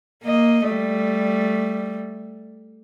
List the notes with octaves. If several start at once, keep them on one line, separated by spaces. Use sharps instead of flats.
A#3 D#5
G3 A3